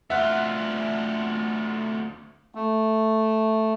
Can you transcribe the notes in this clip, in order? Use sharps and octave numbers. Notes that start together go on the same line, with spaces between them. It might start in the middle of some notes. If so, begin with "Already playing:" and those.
D2 F4 E5 F#5 F#6
A3